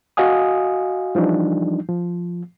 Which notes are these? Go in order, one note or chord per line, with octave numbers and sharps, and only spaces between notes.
F#4 D#5 F5 G#5 D#6
E3 F3 G3 D4 D#4
F3